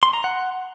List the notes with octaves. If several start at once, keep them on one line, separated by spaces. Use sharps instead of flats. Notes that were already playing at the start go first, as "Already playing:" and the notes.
C6
A#5
F#5